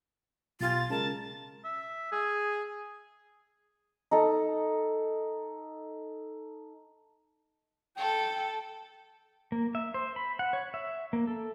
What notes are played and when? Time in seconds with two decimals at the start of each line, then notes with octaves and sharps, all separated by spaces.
0.61 B1 F4 G4 G#5 A6
0.90 C#3 G#3 A#4 A5
1.64 E5
2.12 G#4
4.11 D#4 A4
7.98 A4 G5
9.52 A#3
9.75 E5
9.94 C5
10.16 B5
10.39 F#5
10.53 C#5
10.74 E5
11.13 A#3
11.27 A4